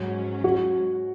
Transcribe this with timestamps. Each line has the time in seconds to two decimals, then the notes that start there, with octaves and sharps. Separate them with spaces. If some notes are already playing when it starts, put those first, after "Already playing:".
Already playing: G#2 F#3 C#4 F#4
0.44 F#4